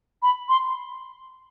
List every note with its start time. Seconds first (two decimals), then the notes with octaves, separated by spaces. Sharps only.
0.23 B5
0.49 C6